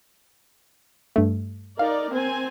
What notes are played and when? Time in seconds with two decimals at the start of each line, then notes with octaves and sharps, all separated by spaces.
1.16 G2 A3
1.79 D#4 A#4 D5 F5
2.11 C4 G#5